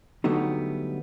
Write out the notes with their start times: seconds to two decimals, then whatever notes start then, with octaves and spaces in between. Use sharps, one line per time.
0.24 D3 F#3 G3 A3 B3 D#4